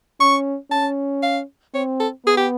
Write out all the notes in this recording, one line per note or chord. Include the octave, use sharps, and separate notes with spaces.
C#4 C#6
C#4 A5
F5
C4 C#5
A4
B3 G#4
G4